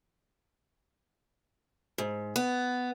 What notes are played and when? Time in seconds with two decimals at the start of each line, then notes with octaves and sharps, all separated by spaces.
1.98 G#2
2.36 B3